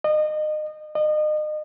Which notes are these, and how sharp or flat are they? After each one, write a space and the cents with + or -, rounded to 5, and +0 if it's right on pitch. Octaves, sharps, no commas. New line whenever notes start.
D#5 -30
D#5 -35